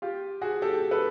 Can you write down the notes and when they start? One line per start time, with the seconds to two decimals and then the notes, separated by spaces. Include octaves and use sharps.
0.02 F4 G4
0.42 F#4 G#4
0.62 G4 A4
0.91 A4 B4